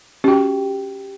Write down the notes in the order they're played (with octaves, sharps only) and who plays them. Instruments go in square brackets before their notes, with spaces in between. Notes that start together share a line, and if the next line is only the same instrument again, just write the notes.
[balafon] C#4 F#4 [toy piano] G4 G5